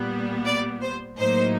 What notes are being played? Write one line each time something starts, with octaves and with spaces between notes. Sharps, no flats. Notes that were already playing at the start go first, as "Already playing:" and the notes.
Already playing: A#2 G3 B3
D5
C5
A2 F#3 A#3 D#4 C5